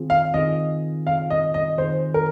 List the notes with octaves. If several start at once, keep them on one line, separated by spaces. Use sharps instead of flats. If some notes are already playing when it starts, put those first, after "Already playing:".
Already playing: D#3 C4 F4 G#4
F5
D#3 C4 F4 G#4 D#5
D#3 C4 F4 G#4 F5
D#5
D#5
D#3 C4 F4 G#4 C5
A#4